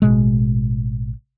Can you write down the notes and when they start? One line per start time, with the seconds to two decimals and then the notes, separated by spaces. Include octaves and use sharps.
0.02 A1 B2 G#3